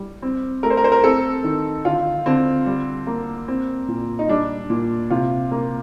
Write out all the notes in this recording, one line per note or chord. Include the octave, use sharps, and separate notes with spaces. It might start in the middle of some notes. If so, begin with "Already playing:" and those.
Already playing: G3
C4
A3 A#4
C5
A#4
C5
A#4
C4 A4
D#3
D3 F4
D3 C4
G3
A#3
C4
A#2
D#4
G3 D4
A#2
C3 F4
A#3